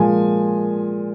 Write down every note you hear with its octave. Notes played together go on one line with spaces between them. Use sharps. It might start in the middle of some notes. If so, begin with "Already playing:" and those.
Already playing: A#2 F3 G#3 G#5